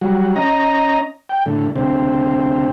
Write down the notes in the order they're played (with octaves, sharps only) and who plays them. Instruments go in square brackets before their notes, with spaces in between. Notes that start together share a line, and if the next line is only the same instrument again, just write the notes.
[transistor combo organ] F#3 G3 F#4
C#4 D#5 A#5
G5
A2 D3
D2 C3 C4